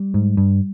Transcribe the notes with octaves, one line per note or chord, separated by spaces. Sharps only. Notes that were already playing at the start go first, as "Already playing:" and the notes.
Already playing: G3
G#2
G2